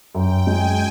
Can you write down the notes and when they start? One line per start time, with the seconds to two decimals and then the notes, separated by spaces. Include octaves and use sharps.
0.14 F#2 G5
0.47 G#3 G#5